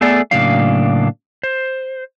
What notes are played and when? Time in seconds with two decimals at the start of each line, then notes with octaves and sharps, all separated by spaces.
0.01 A3 B3 G#4 A4 D5
0.31 A2 C#3 F#3 A#3 D4 F5
1.43 C5